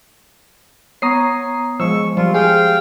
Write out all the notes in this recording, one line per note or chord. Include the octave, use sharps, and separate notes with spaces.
B3 C#5 A#5 D#6 C7
F3 G#3 C#6 E6
F3 G3 F4
G#4 F5 G5